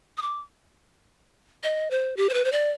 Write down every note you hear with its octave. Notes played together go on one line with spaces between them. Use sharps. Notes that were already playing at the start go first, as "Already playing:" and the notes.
D#6
D6
D#5
C5
G4
C5
B4
C5
D5